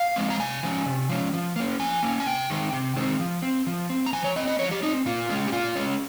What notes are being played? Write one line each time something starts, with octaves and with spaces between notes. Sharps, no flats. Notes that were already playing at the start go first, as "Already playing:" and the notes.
Already playing: F5
F3 G#3 C4
A#5
C3 G#5
F3 G#3 C#4
C3
F3 G#3 C#4
F3
A#3 C#4
F3 G#5
A#3 C#4
G#5
C3 G5
D#3 G#3 C4
C3
D#3 G#3 C4
F3
C4
F3
C4
A#5
F3 G#5
C#5
C4 D#5
D#5
F3 C#5
G4
C4 D#4
A#2 F4
G#3 C#4
G4
A#2 F4
G#3 C#4